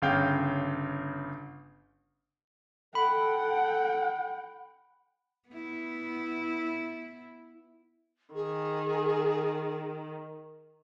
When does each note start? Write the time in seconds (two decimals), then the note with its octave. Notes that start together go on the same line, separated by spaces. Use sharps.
0.02 G1 C#3 F5 G5 G6
2.95 A4 F#5 G5 B5
5.49 B3 E4
8.34 D#3 G#4